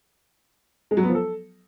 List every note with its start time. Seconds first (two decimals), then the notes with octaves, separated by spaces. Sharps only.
0.91 G#3
0.97 F#3
1.03 B3
1.09 F3
1.15 A4